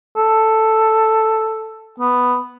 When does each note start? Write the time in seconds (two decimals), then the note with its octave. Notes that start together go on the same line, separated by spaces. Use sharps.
0.17 A4
2.00 B3